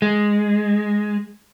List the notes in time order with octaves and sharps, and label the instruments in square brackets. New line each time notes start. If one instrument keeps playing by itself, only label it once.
[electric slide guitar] G#3